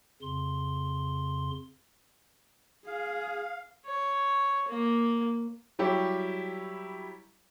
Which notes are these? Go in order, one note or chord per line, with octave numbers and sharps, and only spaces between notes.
F2 C#3 C6
G#4 F5
C#5
A#3
F#3 G3 E4 G4 C#5